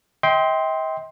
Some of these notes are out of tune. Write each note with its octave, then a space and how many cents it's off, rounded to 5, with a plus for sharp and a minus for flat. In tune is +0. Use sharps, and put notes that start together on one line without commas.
D#5 +45 G5 +0 C6 +0